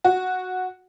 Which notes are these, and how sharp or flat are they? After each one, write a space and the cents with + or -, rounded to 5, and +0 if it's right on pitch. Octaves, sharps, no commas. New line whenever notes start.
F#4 -5